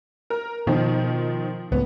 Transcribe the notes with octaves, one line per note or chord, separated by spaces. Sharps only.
A#4
B2 D#3 F3
C#2 A2 B3